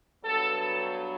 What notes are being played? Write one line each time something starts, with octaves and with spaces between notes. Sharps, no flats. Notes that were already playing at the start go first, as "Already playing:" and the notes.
G2 F#3 B3 A4